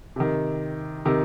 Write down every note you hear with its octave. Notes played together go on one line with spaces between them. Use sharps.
C3 D#3
C3 D#3